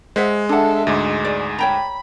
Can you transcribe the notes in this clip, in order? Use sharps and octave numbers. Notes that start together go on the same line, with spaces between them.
G#3 C5 E5 F#5
D4 A4 E5 F#5
D2 G#2 G#3
G#4 D5
C#5 G5 A#5 B5